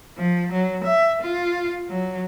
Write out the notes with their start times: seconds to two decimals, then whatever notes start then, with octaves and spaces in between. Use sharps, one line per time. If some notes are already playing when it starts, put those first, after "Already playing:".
0.17 F3
0.52 F#3
0.85 E5
1.22 F4
1.89 F#3